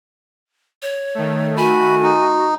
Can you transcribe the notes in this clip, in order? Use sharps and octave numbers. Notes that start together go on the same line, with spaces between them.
C#5
D#3 A3
F#4 G#5 B5
D#4